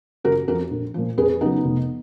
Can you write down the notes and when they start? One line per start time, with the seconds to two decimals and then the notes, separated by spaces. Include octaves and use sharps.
0.24 F#1 F#4 A#4
0.48 F2 F#4 A#4
0.52 F3
0.71 A#1
0.94 A#2 F3
1.18 F2 G#4 B4
1.41 C#3 F#3 B3 D#4
1.64 F1